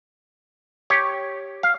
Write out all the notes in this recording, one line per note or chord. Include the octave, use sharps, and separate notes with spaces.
G4 C#5
F5